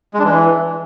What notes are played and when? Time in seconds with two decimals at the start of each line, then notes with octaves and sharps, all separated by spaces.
0.14 G#3
0.19 D4
0.24 E3